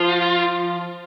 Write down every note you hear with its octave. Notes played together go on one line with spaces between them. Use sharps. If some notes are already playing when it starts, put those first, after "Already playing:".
Already playing: F3 F4